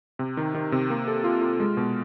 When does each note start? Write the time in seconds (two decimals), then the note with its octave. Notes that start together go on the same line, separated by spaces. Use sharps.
0.19 C3
0.37 D#3
0.54 D#3
0.72 C3
0.90 A#3
1.08 A4
1.24 F4
1.42 F4
1.60 G#3
1.77 B2